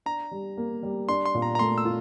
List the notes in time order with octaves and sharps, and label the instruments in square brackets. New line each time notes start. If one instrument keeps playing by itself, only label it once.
[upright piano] D4 [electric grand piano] A#5
[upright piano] G3
A#3
G3
[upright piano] D4 [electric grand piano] C6
[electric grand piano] C6
[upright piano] A#2
[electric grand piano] A#5
A#5
[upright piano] A3 [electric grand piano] C6
[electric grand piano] E6
[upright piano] F4